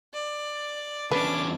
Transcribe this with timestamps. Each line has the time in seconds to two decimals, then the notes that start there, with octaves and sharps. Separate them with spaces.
0.13 D5
1.11 E2 C#4 D4 B4 D6